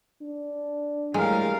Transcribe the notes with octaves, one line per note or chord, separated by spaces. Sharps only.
D4
A2 G3 G#3 A#4 F5